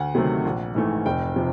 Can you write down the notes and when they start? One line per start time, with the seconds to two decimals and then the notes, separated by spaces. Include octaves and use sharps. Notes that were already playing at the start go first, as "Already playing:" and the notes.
Already playing: D2 F#5
0.15 C3 D#3 F#3 A3
0.45 A#1
0.75 G#2 E3 A3
1.06 F1 G5
1.36 C3 F3